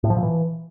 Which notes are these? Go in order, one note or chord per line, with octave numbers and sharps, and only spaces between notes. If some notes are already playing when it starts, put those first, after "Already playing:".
A2
F3
A#2
E3